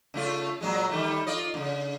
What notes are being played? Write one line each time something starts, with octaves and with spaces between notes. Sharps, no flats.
C#3 A3 F4
A#2 F#3 G#3
D#3 G3 A3
F4 D5 D#5
D#2 C#3